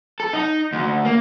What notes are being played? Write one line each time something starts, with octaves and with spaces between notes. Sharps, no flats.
A4
D#4
D2
A#3